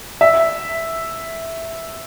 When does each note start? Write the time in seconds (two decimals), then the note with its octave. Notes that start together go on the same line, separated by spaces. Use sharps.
0.21 E5